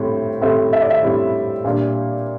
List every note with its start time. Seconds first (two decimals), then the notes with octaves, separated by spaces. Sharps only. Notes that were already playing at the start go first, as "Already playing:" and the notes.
Already playing: A2 G3 C4 E4
0.41 A2 G3 C4 E4 E5
0.73 E5
0.82 D5
0.90 E5
1.03 A2 G3 C4 E4
1.64 A#2 G3 D4